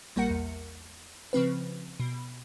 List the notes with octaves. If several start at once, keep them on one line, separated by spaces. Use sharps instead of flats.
A#1 G3 A#3 A#4 F#5 C#7
E2
C#3 F3 C4 B4
B2